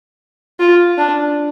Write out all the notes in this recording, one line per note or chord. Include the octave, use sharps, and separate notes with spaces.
F4
D4